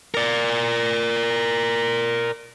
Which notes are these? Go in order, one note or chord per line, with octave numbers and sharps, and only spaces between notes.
A#4 D5